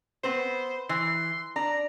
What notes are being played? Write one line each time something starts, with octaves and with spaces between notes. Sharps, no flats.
B3 C4 B4 C5
E3 C6
D4 A#5